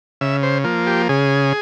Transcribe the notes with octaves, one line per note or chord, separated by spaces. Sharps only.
C#3 E5
C5
F3 A#3
G4
C#3 G#4